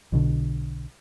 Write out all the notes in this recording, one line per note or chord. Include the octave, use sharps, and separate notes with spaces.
B1 B2 D3